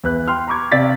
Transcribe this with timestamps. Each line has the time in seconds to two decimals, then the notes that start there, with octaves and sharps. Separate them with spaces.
0.04 E2 B4 F#6
0.28 G5 C6 F6
0.48 A#5 B5 C#6 D6 G#6
0.71 C3 D5 F5 A6 B6